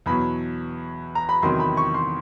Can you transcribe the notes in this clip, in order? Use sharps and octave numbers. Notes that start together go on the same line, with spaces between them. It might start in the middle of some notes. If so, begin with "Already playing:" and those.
E2 B2 F#3 B5
A#5
B5
E2 C3 D#3 F#3 C6
B5
C#6
C6